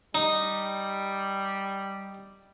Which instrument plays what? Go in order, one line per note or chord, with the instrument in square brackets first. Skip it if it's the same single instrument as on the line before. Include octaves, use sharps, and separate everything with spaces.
[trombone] G3 [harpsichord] D#4